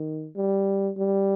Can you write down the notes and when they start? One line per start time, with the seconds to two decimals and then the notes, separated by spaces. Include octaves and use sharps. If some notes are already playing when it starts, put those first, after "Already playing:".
Already playing: D#3
0.36 G3
0.98 G3